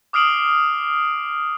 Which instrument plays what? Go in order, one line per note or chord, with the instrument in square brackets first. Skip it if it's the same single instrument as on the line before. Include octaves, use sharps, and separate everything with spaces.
[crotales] D6 D#6 F6 C7 D7 F#7